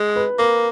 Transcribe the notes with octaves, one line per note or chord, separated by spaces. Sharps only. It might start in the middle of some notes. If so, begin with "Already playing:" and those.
Already playing: G#3
B4
A#3 A#4